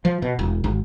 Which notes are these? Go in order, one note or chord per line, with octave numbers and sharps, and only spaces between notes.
F3
B2
E1
G#1